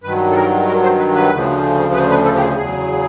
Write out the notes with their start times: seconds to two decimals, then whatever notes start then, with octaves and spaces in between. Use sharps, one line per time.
0.04 G2 D#3 F#3 B4
0.31 A4
0.36 A#4
0.68 A#4
0.83 C5
0.99 B4
1.15 B4
1.31 D2 C#3 F3
1.94 B4
2.10 B4
2.25 A4
2.36 G4
2.41 G#4
2.57 E2 C#3 F#3 G#4